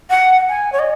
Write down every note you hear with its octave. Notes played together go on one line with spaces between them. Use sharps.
F#5
G#5
C#5
D#5